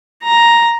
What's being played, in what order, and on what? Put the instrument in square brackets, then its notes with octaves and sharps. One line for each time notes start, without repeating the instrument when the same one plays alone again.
[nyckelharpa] A#5